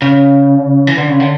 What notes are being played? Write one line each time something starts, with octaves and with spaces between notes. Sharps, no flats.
C#3
E3
D3
C#3
D3